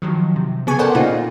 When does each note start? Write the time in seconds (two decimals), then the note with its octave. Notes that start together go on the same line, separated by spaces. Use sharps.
0.02 D#3 F3 F#3
0.36 C3
0.67 C#3 B3 G#4 G#5 C#6
0.79 A4 A#4 C5 D5 F#5 G5
0.95 A#2 C#3 D#4 F4